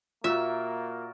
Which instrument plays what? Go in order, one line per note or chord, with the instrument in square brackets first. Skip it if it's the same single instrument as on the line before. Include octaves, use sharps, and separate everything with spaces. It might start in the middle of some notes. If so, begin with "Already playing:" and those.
[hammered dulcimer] A#2 F#4 A#4 [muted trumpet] A#3 [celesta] F4 [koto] E5